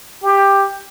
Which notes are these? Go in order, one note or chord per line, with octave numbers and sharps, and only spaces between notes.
G4